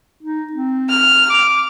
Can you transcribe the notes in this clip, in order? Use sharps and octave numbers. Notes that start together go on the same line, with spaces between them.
D#4
C4
F6
D6